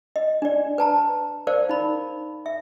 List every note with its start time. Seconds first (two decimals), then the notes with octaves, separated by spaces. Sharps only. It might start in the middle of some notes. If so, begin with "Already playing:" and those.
0.16 D#5
0.42 D4 D5
0.78 B4 A5 A#5
1.47 A#4 C5 D5 F5
1.69 D#4 B5
2.46 E5